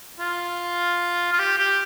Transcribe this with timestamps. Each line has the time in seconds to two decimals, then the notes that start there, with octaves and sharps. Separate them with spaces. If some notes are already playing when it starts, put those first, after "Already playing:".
0.20 F4
1.32 F4
1.39 G4
1.58 G4